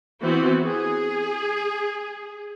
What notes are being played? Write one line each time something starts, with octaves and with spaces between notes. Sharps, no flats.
E3 B3 C4 F#4
G#4